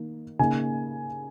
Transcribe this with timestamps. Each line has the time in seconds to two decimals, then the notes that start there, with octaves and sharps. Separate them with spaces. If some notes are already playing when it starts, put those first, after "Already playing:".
Already playing: D#3 A#3
0.39 C#3 A#3 D#4 G#5